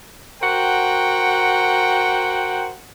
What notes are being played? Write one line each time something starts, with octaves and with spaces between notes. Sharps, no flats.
F#4 A#4 C5 F#5 G5